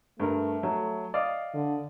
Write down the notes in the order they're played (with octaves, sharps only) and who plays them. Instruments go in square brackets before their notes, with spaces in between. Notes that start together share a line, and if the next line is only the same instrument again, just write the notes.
[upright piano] G2 A#4 [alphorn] A3
[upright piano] F#3
D5 D#5 F5
[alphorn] D3